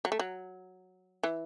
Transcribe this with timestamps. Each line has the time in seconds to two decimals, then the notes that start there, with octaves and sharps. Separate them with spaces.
0.05 F#3
0.12 A3
0.20 F#3
1.23 E3